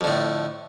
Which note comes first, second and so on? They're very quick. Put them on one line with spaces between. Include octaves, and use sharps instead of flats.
F2 D3 A2